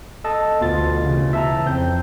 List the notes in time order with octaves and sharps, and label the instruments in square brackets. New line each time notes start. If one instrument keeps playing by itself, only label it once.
[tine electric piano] A4 D#5 A5
[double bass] D2 [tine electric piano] B2 F4 A6
[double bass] C#3 E3
[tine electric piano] E5 A5 A#5
[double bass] F2 [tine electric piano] C4 G6